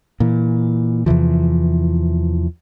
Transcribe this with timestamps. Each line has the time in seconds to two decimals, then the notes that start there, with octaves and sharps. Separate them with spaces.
0.20 A#2 E3
1.06 E2 C3 E3 F3